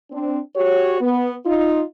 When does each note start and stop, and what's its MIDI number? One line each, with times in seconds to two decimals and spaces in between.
0.12 0.39 60
0.12 0.39 62
0.55 0.98 66
0.55 0.98 67
0.55 0.98 73
1.01 1.33 59
1.46 1.82 63
1.46 1.82 65